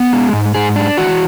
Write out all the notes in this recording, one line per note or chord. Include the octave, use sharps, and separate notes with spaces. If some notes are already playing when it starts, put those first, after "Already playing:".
Already playing: B3
G#3
G#2
G#2 G#4
D4
E3 F#4